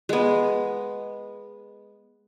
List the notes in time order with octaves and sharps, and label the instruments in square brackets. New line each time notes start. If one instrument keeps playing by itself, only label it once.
[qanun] G#3 B3